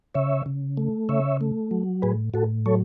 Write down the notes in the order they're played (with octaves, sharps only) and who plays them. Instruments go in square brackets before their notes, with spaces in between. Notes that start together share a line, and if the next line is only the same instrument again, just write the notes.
[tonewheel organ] C#3 C#5 E5
C#3
A3
C#3 C#5 E5
A3
F#3
A2 G#4 B4
A2 F#4 A4
F#3 A4 C#5